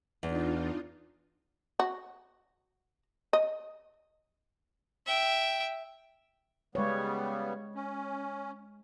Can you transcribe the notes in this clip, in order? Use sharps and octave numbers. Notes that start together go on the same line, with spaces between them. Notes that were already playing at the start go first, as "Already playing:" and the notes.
E2 D4 D#4 F4
F#4
D#5
E5 G5
C#3 G3 G#3 B3 C#5
C#4